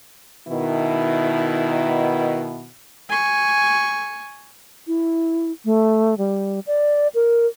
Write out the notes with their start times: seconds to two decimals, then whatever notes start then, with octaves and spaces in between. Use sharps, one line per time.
0.48 B2 D#3 E4
3.09 G#5 C#6
4.87 E4
5.65 A3
6.18 G3
6.67 D5
7.15 A#4